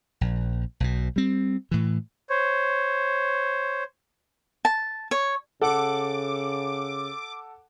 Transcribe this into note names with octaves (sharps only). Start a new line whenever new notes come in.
A#1
B1 B2
G3 C4
A2 E3
C5 C#5
A5
C#5
C#3 A4 F#5 D6